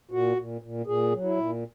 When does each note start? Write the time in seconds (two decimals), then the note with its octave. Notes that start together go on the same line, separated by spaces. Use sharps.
0.11 A#2 F#4
0.37 A#2
0.61 A#2
0.86 A#2 G#4
1.12 F#3
1.24 E4
1.37 A#2